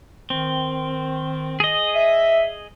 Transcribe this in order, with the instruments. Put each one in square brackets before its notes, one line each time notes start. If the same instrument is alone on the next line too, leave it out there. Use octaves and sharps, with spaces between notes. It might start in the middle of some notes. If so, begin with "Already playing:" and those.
[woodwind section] D#3 [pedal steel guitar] C4
[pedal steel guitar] G#4 D#5
[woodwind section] E5